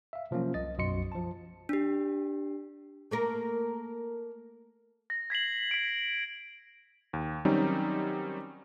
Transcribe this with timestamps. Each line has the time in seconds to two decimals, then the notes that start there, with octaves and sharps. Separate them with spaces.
0.13 E5 F5
0.31 C3 F3 F#3 A#3 C#4
0.54 C2 D#5 A6
0.78 B1 F#2 F#4 D#5 C6 C#7
1.12 F3 A5
1.69 D4 G4
3.11 A3 A#3 A#4
5.10 A#6
5.30 G#6 B6 C7 F#7
5.71 B6 D7
7.13 D#2
7.45 D#3 F#3 G3 C4 C#4 D#4